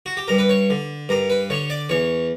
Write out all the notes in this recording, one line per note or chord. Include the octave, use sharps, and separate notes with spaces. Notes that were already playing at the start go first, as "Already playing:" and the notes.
F#4
G4
G2 A#4
B4
C#5
D3
G2 A#4
B4
D3 C#5
D5
E2 C#5